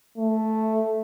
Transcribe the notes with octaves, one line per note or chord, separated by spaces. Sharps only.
A3